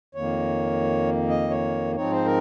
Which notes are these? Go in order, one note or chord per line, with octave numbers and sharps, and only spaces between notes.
F2 D#3 A#3 C#5
D#5
C#5
G#2 F3 C4 D#4 C#5
C5
A#4